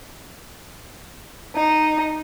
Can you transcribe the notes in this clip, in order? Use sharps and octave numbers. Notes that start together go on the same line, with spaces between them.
D#4